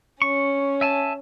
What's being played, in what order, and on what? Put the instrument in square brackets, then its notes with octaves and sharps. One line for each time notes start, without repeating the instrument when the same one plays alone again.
[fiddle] C#4 [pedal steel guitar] C#6
[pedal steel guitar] E5 G#5 A5